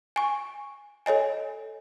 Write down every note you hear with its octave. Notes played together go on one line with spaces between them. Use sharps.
G#5 C#6
A4 C#5 D#5 G#5